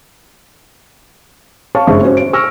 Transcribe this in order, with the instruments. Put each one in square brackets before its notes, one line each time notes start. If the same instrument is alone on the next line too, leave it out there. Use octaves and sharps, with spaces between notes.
[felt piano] C#5 F5 A5 C#6
F#1 G2 G#3 C5 E5 C#6
C#4 F#4 C5
D7
C#6 E6 F6 A#6